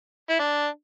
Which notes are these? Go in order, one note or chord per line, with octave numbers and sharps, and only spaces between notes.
E4
D4